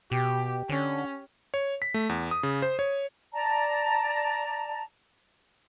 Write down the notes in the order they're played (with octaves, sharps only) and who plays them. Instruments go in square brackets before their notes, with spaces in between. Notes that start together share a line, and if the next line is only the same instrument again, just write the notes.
[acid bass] B2 [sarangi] G4
[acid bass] D3 [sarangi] C#4
[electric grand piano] C#5
B6
A3
E2
D#6
C#3
C5
C#5
[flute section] D5 A5 A#5